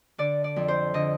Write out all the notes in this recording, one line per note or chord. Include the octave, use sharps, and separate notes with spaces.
D3 D5
D5
F2
C5
D3 D#5